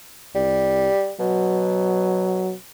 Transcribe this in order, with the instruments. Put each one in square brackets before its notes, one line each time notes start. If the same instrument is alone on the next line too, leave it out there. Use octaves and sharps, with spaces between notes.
[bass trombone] C2 [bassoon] G3
[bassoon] B2 [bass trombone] F#3